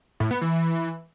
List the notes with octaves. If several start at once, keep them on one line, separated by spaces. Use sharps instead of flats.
A2
B3
E3